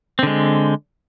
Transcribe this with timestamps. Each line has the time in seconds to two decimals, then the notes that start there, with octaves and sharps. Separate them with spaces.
0.19 C4
0.23 D3
0.27 G#3